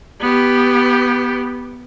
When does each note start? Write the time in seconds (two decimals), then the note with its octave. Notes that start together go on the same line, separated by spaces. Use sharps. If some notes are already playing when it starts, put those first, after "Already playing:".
0.20 B3 G4